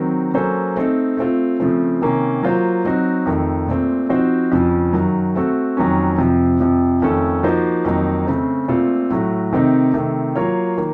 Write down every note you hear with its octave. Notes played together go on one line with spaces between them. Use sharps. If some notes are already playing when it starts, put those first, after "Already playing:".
Already playing: D#3 F#3 C4
F#3 A#3 C#4 A4 C5
A3 C4 D#4 A4
A3 C4 F4
C#3 F3 A3 C4
C3 D#3 A#3 C#4
F#3 A#3 F4 C5
F#3 C4 D#4 F#4
F2 D#3 A3
A#2 A3 C4
F3 C4 D#4 F#4 C5
F2 C#3 F3
F#2 D#3 F#3
A3 C4 F#4 A4
F2 D#3 F#3 A#3 C#4
F2 C3 F3 C4
F2 C3 F3
F2 D#3 A3 C#4 A4
F3 A#3 D#4 F#4 C5
F2 D#3 F#3 A#3 D#4
C#3 A3 C4
A#2 A3 C4 F4 A4
A2 F#3 A3
C3 D#3 A3 C4 D#4
C3 D#3 A3
F#3 A#3 F4 A#4 C#5
D#3 A#3